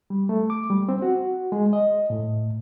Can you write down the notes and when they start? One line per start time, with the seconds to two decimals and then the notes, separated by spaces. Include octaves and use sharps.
0.10 G3
0.29 A3
0.50 D6
0.70 G3
0.89 C4
1.02 F#4
1.52 G#3
1.73 D#5
2.10 A2